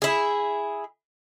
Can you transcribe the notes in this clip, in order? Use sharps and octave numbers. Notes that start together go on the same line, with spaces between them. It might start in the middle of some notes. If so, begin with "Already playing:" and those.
E4 G#4